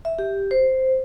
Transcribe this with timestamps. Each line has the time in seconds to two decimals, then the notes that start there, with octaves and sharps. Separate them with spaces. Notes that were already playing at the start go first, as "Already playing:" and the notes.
0.05 E5
0.19 G4
0.51 C5